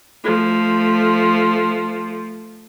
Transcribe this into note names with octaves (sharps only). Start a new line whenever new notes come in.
F3 A3